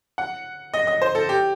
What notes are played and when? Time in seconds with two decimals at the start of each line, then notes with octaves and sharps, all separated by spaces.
0.18 F#5
0.74 D#5
0.87 D#5
1.02 C5
1.15 A4
1.29 G4